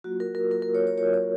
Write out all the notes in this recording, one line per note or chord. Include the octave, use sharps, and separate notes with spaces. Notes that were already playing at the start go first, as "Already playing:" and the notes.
F#3 A#3 F4 F#4
A#4
A#4
F#3 A#3 F4 A#4
A#4
C#5
C#5
F#3 A#3 F4 C#5
C#5